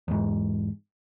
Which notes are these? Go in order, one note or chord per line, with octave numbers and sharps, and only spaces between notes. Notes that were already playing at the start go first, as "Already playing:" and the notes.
E2 G#2